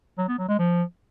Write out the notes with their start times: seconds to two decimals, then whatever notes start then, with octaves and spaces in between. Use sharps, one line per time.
0.18 F#3
0.28 B3
0.38 F#3
0.48 G#3
0.59 F3